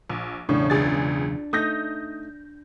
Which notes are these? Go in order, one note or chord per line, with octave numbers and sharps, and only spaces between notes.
A#1
B1 E2 A2 C#3 D4
C#2 G#4 A6
A3 D#4 D#6 G6 A#6